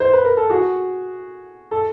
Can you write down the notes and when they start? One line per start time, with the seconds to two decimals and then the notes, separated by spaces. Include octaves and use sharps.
0.00 C5
0.13 B4
0.25 A#4
0.37 A4
0.50 F#4 G#4
1.71 A4